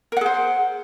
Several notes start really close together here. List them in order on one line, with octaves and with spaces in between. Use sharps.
A#4 F#5 G#4 C5